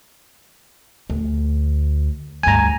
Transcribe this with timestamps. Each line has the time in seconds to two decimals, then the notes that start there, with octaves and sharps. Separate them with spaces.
1.10 D2
2.43 D2 G2 G#5 A#5